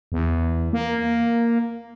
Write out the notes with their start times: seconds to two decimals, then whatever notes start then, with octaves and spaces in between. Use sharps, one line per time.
0.12 E2
0.73 A#3